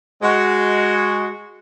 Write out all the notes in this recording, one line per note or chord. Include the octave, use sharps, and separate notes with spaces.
G#3 F#4